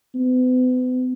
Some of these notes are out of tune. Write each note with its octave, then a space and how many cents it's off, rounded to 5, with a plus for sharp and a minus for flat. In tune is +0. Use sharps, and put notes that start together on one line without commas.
B3 +40